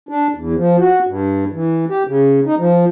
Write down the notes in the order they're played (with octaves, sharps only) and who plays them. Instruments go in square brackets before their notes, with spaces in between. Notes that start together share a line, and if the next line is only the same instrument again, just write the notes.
[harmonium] D4
E2
F3
F#4
G2
E3
G4
C#3
D#4
F3